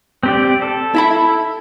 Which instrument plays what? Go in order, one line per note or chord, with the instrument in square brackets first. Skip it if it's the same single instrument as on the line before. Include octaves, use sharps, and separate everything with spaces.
[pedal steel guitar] C4 G4 D5
A4
[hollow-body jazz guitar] E4 E5 B5